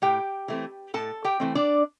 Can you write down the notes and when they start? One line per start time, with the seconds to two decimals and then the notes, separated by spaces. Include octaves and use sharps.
0.02 A2 G4 G5
0.48 E3 A3 C4
0.94 A2 A4 A5
1.24 G4 G5
1.40 E3 A3 C4
1.55 D4 D5